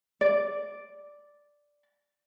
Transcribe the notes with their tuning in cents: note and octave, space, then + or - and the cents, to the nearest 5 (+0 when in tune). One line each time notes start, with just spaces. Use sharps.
D5 -5